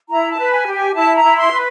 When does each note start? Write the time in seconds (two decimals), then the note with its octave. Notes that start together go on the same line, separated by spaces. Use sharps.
0.09 E4 A#5
0.30 A5
0.37 B4
0.51 G#5
0.66 G4
0.73 G#5
0.94 E4 A5
1.16 A#5
1.23 E4
1.37 C6
1.51 B4